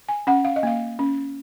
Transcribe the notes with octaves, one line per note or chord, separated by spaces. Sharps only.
G#5
C#4 F#5
F5
D#5
A#3 F5
C#4